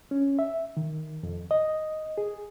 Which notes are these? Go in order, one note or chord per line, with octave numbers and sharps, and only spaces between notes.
C#4
E5
D#3
F2
D#5
G#4